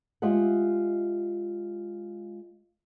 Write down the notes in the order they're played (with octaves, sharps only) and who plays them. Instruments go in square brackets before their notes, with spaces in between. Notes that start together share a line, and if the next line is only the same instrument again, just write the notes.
[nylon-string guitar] G#3 F4 G4 D#5 E5 F#5